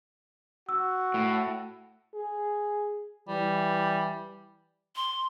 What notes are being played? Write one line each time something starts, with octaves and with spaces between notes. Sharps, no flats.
F#4 E6
A2
G#4
E3 G3
C6